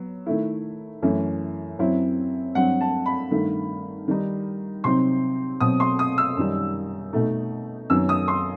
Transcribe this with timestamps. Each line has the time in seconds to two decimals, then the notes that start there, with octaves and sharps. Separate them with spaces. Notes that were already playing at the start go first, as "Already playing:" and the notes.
Already playing: F#3 B3
0.26 D#3 A3 E4
1.02 F#2 E3 A3 E4
1.79 F#2 F#3 C4 E4
2.55 G2 F#3 C4 F#5
2.81 A5
3.06 B5
3.31 G2 D#3 A3
4.08 D#3 G3 D#4
4.84 C3 F#3 C4 D#4 C6
5.60 B2 F#3 C4 D#6
5.80 C6
5.99 D#6
6.18 E6
6.37 F#2 D#3 G3 D#4
7.13 B2 A3 D#4
7.90 F#2 D#3 F#3 B3 E6
8.09 D#6
8.28 C6